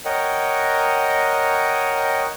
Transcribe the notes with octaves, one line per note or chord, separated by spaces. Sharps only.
A#4 C#5 D#5 F#5 G5